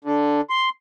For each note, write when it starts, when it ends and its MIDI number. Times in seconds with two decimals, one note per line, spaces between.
0.05 0.41 50
0.50 0.69 84